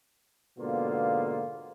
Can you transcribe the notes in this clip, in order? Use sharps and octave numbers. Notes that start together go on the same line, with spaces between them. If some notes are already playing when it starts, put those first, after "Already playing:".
G#2 B2 D3 A#3 B3 F4